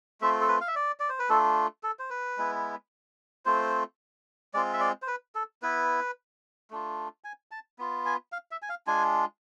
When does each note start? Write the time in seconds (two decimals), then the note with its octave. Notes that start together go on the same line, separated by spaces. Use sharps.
0.21 A3 C4 F4 E5
0.41 A4
0.48 B4
0.61 F5
0.68 E5
0.75 D5
1.00 D5
1.09 C5
1.19 B4
1.29 A3 D4 F4 A4
1.83 A4
1.99 C5
2.10 B4
2.37 G#3 B3 E4
3.45 A3 C4 F4 C5
4.54 G#3 C4 F4 D5
4.73 E5
4.80 D5
5.02 C5
5.07 B4
5.35 A4
5.62 B3 E4 B4
6.70 A3 D4 F4
7.24 G#5
7.51 A5
7.79 B3 F4
8.06 G#5
8.32 F5
8.51 E5
8.62 G#5
8.69 F5
8.87 G#3 D4 F4 G#5